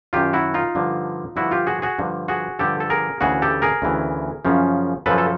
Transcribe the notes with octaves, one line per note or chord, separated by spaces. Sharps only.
F#2 D#3 F4 G4
E4 F#4
D#4 F4
G2 D3 F3
G2 D3 F3 E4 F#4
F4 G4
F#4 G#4
F#4 G#4
G2 D3 F3
F#4 G#4
G2 D3 F3 G4 A4
A4
G#4 A#4
D2 C#3 E3 F#4 G#4
G4 A4
G#4 A#4
D2 C#3 E3
F#2 C#3 F3
F#2 C#3 F3 A4 B4
A4